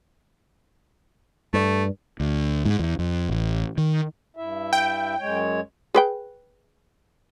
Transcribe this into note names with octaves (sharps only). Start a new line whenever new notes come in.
G2 A3
D2
G#2
E2
F2
A1
D#3
G2 E4 E5
G5
F#2 G#3 C#5
G#4 B4 G5